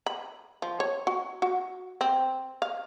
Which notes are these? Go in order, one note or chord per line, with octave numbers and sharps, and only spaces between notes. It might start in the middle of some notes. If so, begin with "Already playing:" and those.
B5
F3
C#5
F#4
F#4
C4
F5